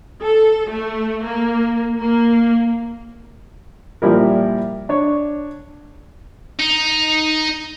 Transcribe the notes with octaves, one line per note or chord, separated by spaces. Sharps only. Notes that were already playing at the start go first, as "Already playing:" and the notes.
A4
A3
A#3
A#3
A#2 F3 G3 E4 A#4
D4 C#5
D#4